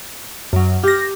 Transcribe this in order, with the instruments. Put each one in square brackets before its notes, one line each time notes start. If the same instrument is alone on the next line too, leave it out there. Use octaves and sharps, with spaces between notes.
[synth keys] F#2 F#3
[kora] G4 [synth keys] F6 A#6